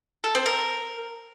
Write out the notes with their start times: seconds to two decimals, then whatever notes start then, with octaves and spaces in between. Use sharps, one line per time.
0.24 A4
0.35 C4
0.46 A#4